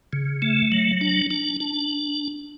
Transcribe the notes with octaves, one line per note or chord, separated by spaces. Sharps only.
C#3
A3
F#3
D4
D4
D4